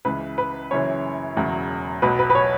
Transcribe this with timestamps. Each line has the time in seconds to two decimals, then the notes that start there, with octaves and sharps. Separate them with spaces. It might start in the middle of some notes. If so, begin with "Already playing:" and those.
0.05 C#2 C#3 E3 B4
0.38 B4
0.71 F#1 F#2 C#3 E3 C#5
1.36 E1 E2 C#3 F#3
2.02 B1 B2 F#3 B4
2.19 B4
2.30 B4
2.35 C#5